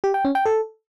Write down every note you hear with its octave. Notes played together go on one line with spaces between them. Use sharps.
G4
G5
C#4
G5
A4